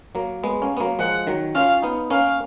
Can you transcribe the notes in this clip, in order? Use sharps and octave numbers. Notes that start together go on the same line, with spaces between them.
F#3 A#3
G#3 B3
A#3 C#4
B3
F#3 A#3
F3 G#3 F#5
D#3 F#3
C#4 F4 F5
B3 D#4
A#3 C#4 F5